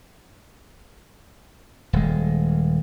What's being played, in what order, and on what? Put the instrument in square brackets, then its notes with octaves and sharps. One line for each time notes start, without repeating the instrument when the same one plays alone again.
[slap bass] D#1 G#3